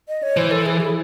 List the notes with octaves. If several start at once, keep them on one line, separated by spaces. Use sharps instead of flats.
D#5
C#5
E3 C5
A4
G#4
E4